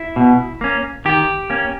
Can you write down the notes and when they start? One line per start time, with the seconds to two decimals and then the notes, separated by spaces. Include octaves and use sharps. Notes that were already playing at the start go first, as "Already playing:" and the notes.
Already playing: E4
0.16 B2
0.61 A#3 C#4
1.05 D#3 G4
1.50 A#3 C#4